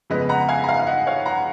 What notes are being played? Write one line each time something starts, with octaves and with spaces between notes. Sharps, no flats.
F2 C#3 G#3 B3 B4 D#5
F#5 A#5
F5 G#5
A#5
F5 G#5
F5
D#5 F#5
C#5 F5
F#5 A#5